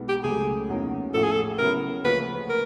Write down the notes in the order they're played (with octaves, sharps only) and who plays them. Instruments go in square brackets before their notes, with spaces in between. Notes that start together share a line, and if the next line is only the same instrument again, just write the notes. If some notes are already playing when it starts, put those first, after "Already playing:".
Already playing: [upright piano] B1 B2 G#3 B3 D#4
[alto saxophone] G4
[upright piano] C#2 C#3 F#3 A3 [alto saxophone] G#4
[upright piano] E2 C#3 F#3 A#3 D#4
[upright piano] A1 A2 F3 [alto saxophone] A4
[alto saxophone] G#4
A4
[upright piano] C#3 F#3 B3 E4 [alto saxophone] A#4
[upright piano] D2 C#3 F3 A#3 C#4 [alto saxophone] B4
[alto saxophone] A#4